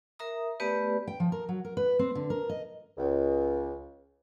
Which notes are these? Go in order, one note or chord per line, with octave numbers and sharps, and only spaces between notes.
A#4 E5 A#5 D#6
A3 B3 G4 B4 D5
G5
F3
A#4
F#3
A#4
B4
C4
D3
A#4
D#5
C#2